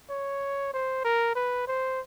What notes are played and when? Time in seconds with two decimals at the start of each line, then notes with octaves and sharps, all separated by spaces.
0.10 C#5
0.74 C5
1.05 A#4
1.36 B4
1.68 C5